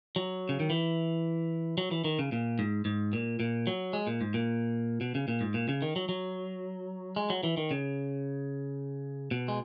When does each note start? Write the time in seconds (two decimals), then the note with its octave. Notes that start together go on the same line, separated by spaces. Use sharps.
0.16 F#3
0.49 C#3
0.60 D#3
0.70 E3
1.78 F#3
1.91 E3
2.04 D#3
2.19 C#3
2.32 A#2
2.59 G#2
2.85 G#2
3.13 A#2
3.40 A#2
3.67 F#3
3.93 G#3
4.07 A#2
4.21 G#2
4.34 A#2
5.01 B2
5.15 C#3
5.28 A#2
5.41 G#2
5.54 A#2
5.69 C#3
5.82 D#3
5.96 F#3
6.09 F#3
7.16 G#3
7.30 F#3
7.43 E3
7.57 D#3
7.71 C#3
9.31 B2
9.48 G#3